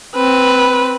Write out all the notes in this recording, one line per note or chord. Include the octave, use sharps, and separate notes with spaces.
C4 B4